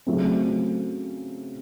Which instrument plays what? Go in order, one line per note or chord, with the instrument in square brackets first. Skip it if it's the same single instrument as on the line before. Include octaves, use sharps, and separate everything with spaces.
[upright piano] C#3 F#3 A3 C4